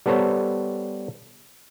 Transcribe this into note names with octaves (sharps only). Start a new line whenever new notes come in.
G3 B3 A4 C5 C#5